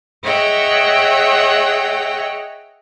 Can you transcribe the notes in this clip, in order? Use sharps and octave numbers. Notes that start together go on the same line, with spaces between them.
G#4 C#5 D#5 E5 F#5 G5